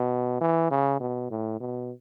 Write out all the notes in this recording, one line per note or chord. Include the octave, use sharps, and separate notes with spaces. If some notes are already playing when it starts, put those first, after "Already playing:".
Already playing: B2
E3
C#3
B2
A2
B2